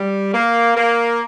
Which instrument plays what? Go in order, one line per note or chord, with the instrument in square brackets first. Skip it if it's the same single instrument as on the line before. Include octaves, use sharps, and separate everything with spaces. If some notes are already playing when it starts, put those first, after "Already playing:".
Already playing: [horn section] G3
A#3
A#3